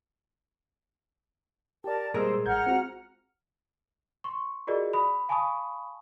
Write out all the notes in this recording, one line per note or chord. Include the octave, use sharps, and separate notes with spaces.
G4 A#4 D5 A5
A#2 G3 G#3 G#4 A#4 C5 E6
A1 F#5 A#5 F6 G6 G#6
C4 F4 F#4
C6 C#6
F4 F#4 G#4 A#4 D5 D#5
B5 D#6
F5 G#5 A5 B5 C#6 D#6